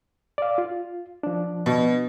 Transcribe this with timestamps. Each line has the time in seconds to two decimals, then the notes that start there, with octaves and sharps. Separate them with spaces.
0.38 D5 F5
0.58 F4
1.23 F3 D4
1.66 B2